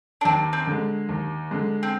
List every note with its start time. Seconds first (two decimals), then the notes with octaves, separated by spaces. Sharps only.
0.21 D4
0.25 D#2 C4
0.53 C4
0.67 D3 G#3
1.09 D#2
1.51 D3 G#3
1.83 C4